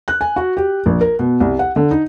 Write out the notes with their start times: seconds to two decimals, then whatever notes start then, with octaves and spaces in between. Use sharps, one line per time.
0.08 F#6
0.21 G#5
0.36 F#4
0.57 G4
0.86 A#1
1.01 A#4
1.19 B2
1.40 C2
1.59 F#5
1.76 D3
1.91 D#4